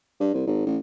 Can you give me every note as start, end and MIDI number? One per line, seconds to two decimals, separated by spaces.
0.20 0.33 43
0.34 0.45 36
0.47 0.64 32
0.66 0.78 33